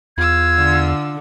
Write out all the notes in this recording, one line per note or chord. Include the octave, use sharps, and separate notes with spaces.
E2 F4 E6 G#6
D3